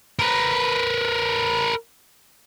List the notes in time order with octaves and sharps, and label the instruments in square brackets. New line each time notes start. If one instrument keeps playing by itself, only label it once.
[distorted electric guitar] A#4 B4